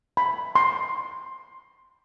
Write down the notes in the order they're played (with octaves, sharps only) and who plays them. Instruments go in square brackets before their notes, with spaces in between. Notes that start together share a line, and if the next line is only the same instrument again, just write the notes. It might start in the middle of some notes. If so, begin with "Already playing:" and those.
[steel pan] B5
C6